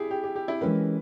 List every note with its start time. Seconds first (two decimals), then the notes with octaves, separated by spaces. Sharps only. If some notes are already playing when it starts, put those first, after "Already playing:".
Already playing: E4 G4 G#4
0.11 G4
0.23 G4
0.36 G4
0.48 E4
0.61 E3 G#3 C#4 G4 A#4 B4